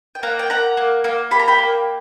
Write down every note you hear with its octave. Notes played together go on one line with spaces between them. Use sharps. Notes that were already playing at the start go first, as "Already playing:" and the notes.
G5
A#3 F#5 A#5
G5
A#3 F#5 A#5
A#3
A#3
G4 B5
A#5
G5 B5
A#3